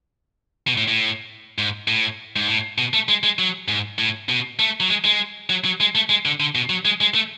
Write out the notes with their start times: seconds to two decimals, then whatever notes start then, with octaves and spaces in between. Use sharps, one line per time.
0.67 B2
0.77 A2
0.88 A2
1.58 G#2
1.88 A2
2.36 G#2
2.48 A2
2.78 B2
2.93 A3
3.09 G#3
3.23 G#3
3.39 F#3
3.68 G#2
3.98 A2
4.29 B2
4.59 A3
4.80 F#3
4.89 G#3
5.05 G#3
5.50 F#3
5.65 F#3
5.80 G#3
5.95 A3
6.10 G#3
6.26 D3
6.40 D3
6.55 B2
6.70 F#3
6.85 G#3
7.01 G#3
7.15 A3